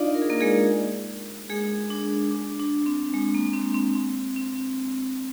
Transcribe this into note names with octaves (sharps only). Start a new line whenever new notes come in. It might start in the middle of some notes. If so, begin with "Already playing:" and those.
Already playing: D4 D#4 F4 D5 D#5 F5
A#4
G#4
A#3 A#4
G#3 G#4
G#3 G#4
D4
D4
D4
C4
G#3
A#3
C4
C4
C4
C4